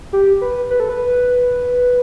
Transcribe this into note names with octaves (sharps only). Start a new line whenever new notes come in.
G4
B4
B4
A4
B4